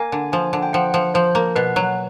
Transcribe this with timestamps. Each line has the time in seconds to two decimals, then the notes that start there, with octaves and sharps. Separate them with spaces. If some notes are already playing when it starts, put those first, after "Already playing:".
Already playing: A#3 G#5
0.12 D3
0.32 F3 G#5
0.53 D3
0.63 G5
0.73 F3 F#5
0.94 F3
1.14 F3 C5
1.35 A#3
1.56 B2 B4
1.76 F#3